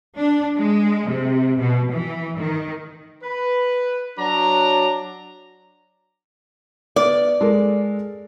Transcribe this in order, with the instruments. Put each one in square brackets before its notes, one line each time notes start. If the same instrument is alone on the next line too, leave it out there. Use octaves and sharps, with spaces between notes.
[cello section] D4
G#3
C3
B2
E3
D#3
[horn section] B4
F#3 D4 A#5
[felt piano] B3 [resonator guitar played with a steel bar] D5
[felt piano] G#3 A4 A#4